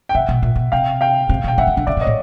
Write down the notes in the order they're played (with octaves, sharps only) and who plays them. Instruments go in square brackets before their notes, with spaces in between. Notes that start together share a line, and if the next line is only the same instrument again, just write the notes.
[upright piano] G5
[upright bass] C3 [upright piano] E5 F#5
[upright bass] B2
A#2
B2
[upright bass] C3 [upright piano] F5 G5
[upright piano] F5 G5
[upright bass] C3
[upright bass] B2 [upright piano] G5
[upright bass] C3 [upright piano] E5 F#5
[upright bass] C#3
D3
[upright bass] C#3 [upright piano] D5 E5
[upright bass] C3
[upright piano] C#5 D#5
[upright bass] A2